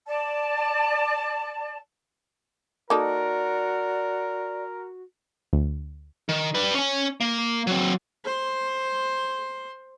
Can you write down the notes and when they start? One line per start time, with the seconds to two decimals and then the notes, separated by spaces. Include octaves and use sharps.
0.08 D5 A5
2.90 A#3 D#4 F#4 A4 A#4 D5
5.53 D2
6.29 D#3
6.55 G3 B4
6.74 C#4 G#5
7.20 A#3
7.67 F#3 C4
8.24 C5 C6